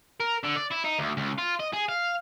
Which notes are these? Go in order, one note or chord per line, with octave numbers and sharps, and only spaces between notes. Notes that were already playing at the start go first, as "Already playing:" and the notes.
A#4
D3
D5
E4
D#4
D2
C#2
F4
D#5
G#4
F5